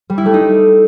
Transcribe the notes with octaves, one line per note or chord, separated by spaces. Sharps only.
G3
E4
A3
D#4